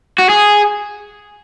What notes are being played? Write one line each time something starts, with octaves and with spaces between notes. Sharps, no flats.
F#4
G#4